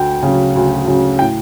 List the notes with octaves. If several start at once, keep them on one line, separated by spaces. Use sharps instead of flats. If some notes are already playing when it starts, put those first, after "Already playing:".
Already playing: D2 G5
C#3
F#3
D2
C#3 F#3
A2 G5